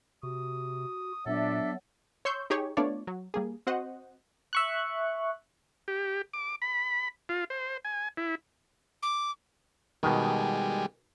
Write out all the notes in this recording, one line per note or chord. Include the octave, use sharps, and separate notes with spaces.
C3 F#4 D#6
A#2 F#3 B3 D4 A4 E5
C#5 C6 C#6 E6 G6
D#4 G4 G#4 C#5
A3 B3 D4 F4 C#5 D5
F#3
G3 A#3 G#4
C4 F#4 C5 D#5 F#5
E5 C#6 F#6
G4
D6
B5
F4
C5
G#5
E4
D6
B2 D#3 G3 G#3